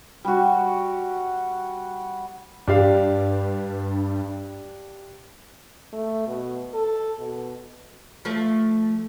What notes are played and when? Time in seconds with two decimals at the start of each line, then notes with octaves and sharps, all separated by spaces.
0.24 G3 F#4
2.68 G2 D4 G4 F5
5.93 A3
6.27 B2
6.74 A4
7.19 B2
8.25 F3 A3 E5